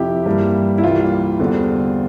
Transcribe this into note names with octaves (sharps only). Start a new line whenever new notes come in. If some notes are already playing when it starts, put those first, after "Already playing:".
Already playing: F2 C3 F3 E4 G4
G2 E3 G3 A#3
E4
C2 C3 E3 G3 A#3 F4
E2 D3 G3 C4